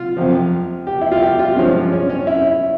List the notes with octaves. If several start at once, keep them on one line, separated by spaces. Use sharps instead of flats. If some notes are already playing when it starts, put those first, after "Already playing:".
Already playing: F4
F2 C3 F3
G4
E4
F4
G4
F4
G2 F3 G#3 C#4
C#4
C#4
E4